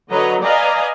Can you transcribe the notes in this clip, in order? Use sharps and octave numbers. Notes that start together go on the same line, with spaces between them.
D3 F#3 B4 C#5 D#5 A#5
B4 D5 D#5 F5 G#5 A#5